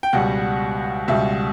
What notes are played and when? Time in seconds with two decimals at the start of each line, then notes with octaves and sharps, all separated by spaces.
0.03 G5
0.13 C#2 B2 G3 F#5
1.08 C#2 B2 G3 E5